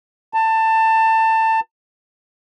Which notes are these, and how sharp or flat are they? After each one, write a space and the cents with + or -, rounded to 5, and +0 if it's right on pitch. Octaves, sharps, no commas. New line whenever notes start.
A5 +20